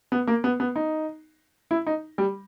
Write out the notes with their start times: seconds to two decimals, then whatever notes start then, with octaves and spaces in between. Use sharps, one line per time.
0.12 B3
0.27 A#3
0.44 B3
0.60 B3
0.76 D#4
1.71 E4
1.87 D#4
2.18 G3